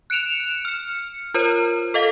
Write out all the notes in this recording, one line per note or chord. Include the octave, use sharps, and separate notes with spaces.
F#6 C#7 D7 E7 F7
F6 C#7
F4 A#4 C5 C#5
A4 D#5 F5 B6